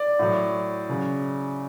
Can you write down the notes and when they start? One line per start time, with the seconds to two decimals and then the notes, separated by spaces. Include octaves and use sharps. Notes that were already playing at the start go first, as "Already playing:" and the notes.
Already playing: D5
0.19 A2 F#3
0.89 C#3 F#3